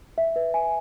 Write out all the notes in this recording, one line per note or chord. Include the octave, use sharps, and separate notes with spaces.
E5
B4
G#5